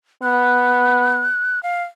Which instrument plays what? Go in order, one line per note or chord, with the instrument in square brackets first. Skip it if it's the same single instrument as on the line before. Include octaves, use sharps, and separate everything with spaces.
[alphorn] B3 [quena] F#6
[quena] F5